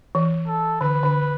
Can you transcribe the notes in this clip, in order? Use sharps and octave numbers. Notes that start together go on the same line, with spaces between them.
E3
A4
D3 B4
D3